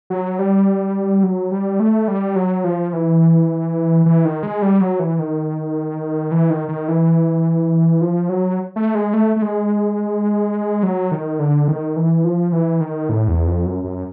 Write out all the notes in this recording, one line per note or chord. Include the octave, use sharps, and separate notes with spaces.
F#3
G3
F#3
G3
A3
G3
F#3
F3
E3
E3
D#3
G#3
G3
F#3
E3
D#3
E3
D#3
D#3
E3
F3
F#3
A3
G#3
A3
A3
G#3
F#3
D#3
D3
D#3
E3
F3
E3
D#3
A2
E2
F2
F#2
F#2